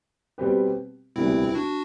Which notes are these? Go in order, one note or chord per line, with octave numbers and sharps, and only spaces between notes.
B2 G3 C4 G4 B4
E1 D2 C3 G3 B3 C4 E4
E4
D4 F#4